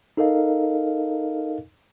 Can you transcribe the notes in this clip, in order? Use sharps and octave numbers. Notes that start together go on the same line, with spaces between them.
D#4 A4 A#4 D#5 F5